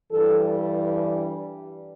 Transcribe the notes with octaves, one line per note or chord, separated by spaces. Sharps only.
G2 E3 G3 A4